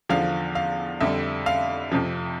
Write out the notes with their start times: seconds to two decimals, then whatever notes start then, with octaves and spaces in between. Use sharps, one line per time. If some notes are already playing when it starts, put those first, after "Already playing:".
0.09 E2 D3 F3 F5
0.55 F5
1.00 F2 D3 G3 E5
1.46 F5
1.92 F2 C3 F3